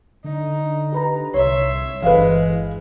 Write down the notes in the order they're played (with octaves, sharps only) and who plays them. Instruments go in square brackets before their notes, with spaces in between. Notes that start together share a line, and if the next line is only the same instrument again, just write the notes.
[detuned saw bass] D3 [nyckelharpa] D#4
[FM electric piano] G4 B4 A#5
[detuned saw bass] C2 [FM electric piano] C#5 [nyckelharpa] E5 C6
[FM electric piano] G1 [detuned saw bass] E3 [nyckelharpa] G#3 [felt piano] B4 F5